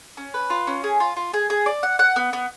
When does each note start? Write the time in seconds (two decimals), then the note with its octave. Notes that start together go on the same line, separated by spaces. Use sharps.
0.17 C#4
0.34 B4
0.50 F4
0.67 C#4
0.84 G#4
1.00 F4
1.16 F4
1.33 G#4
1.50 G#4
1.66 D5
1.83 F#5
1.99 F#5
2.16 B3
2.33 B3